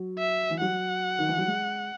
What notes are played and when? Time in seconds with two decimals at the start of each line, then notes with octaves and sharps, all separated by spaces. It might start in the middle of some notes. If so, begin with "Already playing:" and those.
Already playing: F#3
0.18 E5
0.50 E3
0.61 F#3 F#5
1.19 D#3
1.28 E3
1.38 F#3
1.47 G#3